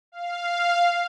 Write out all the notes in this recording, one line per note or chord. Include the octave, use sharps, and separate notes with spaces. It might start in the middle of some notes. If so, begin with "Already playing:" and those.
F5